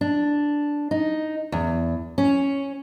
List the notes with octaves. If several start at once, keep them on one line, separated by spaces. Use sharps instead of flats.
D4
D#4
E2
C#4